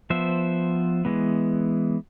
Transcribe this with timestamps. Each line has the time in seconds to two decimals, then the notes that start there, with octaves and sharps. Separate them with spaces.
0.10 F3 B3 C5 E5
1.05 E3 G#3 B3